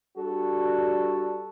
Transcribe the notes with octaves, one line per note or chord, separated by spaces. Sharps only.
G3 D4 F#4 A4